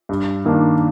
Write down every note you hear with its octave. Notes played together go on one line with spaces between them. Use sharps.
G2
D#3 A#3 D4